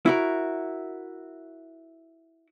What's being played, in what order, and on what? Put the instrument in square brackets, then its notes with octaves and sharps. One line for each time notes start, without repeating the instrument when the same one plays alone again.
[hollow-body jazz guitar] E4 F#4 A#4